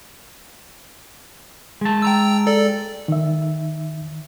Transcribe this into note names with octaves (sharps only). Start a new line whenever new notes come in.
G#3 A5
G5 A#5 E6
A4 D5
D#3 E5